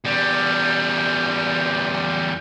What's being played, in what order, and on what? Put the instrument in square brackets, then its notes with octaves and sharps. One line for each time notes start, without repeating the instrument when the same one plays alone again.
[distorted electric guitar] E2 G3